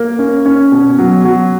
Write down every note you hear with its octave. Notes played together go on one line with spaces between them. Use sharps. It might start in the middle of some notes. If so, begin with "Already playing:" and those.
Already playing: A#3
C#4
C#4
B2
F#3
F#3